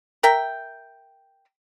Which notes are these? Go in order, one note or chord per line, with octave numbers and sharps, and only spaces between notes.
A#4 E5 G5